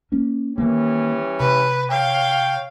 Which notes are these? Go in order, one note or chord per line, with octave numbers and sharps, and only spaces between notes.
A#3 C#4
D#3 E3 G3 A#3 C#4
C3 B4
C#5 F5 G5